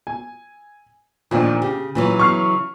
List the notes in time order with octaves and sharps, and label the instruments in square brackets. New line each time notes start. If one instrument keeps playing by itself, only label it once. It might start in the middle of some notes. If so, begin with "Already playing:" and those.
[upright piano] G#5
[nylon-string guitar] F2 D#3 F3 [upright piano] A#2 C4 D4
[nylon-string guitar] C#3 [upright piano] G4
[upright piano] A#2 [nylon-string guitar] C#3 E3 F#3
[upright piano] C#6 F6 C7